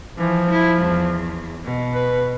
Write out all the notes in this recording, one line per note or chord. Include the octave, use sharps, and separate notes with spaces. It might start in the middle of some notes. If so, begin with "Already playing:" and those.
E3 F3
E4
E2
B2
B4